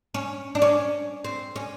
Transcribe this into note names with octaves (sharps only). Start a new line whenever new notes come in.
C#4
D4
C#4
C4
C#4